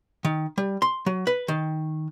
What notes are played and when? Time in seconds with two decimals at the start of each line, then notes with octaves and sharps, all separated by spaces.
0.25 D#3
0.58 G3
0.82 C6
1.06 F#3
1.27 B4
1.48 D#3